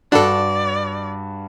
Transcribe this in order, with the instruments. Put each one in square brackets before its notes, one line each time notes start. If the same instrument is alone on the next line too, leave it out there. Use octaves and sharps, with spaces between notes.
[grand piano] G2 F#4 [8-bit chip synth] D4 A4 [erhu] D5